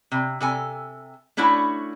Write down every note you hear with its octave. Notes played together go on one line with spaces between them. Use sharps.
C3
C3 A4 G#5
A3 C#4 D4 E4 F#4